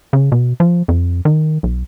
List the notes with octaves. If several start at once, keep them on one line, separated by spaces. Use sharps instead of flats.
C#3
B2
F3
F2
D#3
B1